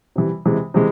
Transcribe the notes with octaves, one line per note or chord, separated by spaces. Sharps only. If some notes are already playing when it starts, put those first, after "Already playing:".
C3 E3 G3
C3 E3 G#3
C3 E3 G#3